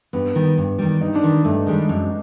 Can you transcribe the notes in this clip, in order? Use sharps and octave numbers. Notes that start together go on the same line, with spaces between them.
G2 B3
D#3 G3
G2
D#3 G3
G2 D#4
D4
D#3 G3
G2 A3
D#3 G3 G#3
F#2